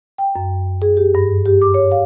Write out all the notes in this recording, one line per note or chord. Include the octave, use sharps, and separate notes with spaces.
G5
F#2
G#4
G4
G2
G4
D6
C#5
F5